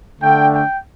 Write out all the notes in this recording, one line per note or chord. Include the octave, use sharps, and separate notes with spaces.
D3 A3 D4 G5
G5